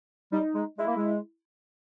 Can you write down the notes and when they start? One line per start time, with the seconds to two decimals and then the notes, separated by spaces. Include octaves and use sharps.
0.32 G3 D#4
0.55 G#3
0.78 G#3 E4
0.87 A#3
0.96 G#3